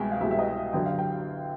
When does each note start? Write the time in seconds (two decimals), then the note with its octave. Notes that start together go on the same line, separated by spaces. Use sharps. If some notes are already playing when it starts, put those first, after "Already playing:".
Already playing: C2 B2 G#3 G5 G#5
0.12 F5
0.21 C2 B2 G#3 E5
0.31 E5
0.39 D#5
0.55 E5
0.73 F#2 D3 F#3 B3 G5
0.86 F5
0.99 G5